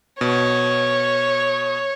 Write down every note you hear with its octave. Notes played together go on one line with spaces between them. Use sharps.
B2 C#5